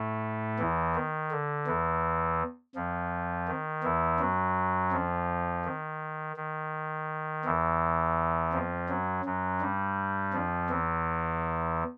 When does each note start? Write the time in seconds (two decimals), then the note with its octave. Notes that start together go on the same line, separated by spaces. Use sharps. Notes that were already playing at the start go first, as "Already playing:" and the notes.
Already playing: A2 A3
0.59 E2 E3
0.95 D#3
1.31 D3
1.67 E2 E3
2.75 F2 F3
3.48 D#3
3.83 E2 E3
4.20 F#2 F#3
4.92 F2 F3
5.64 D#3
6.36 D#3
7.45 E2 E3
8.53 F2 F3
8.89 F#2 F#3
9.25 F#2 F#3
9.61 G2 G3
10.33 F2 F3
10.70 E2 E3